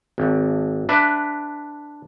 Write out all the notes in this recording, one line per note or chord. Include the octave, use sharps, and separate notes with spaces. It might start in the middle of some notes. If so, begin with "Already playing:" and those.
G#1
D4 B4 E5